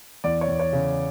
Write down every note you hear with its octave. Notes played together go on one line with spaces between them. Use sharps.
E2 D5
C#5
E2
C#5
C#3